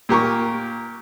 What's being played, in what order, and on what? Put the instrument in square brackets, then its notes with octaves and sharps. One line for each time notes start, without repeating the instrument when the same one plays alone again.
[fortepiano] A#2 G4 A#4 C#6